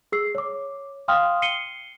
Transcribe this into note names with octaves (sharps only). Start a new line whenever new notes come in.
G#4 E6 C7
C#5 D6
F5 G5 C6 D#6 F6
C7 C#7 D#7 G7